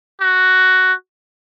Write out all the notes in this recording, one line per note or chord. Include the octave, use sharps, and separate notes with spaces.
F#4